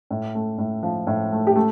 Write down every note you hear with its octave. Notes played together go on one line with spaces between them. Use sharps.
A2
A3
A2
F3
A2
A3
G4
A3